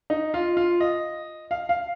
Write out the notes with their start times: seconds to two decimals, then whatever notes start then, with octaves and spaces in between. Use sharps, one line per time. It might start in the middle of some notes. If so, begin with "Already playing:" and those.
0.10 D#4
0.34 F4
0.57 F4
0.81 D#5
1.51 F5
1.69 F5